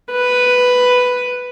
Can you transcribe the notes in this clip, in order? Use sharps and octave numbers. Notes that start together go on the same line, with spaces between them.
B4